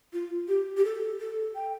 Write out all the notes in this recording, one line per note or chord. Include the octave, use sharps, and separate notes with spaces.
F4
G4
G4
A4
A4
G5